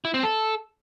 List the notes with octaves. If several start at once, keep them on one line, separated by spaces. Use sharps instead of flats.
E4
C4
A4